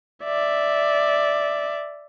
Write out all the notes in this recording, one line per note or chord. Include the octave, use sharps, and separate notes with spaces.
D5 E5